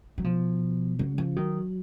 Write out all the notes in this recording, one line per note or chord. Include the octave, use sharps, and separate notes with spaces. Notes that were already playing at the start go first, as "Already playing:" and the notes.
F#3
B2 F3
C#3 F#3
F3
D#3 F#3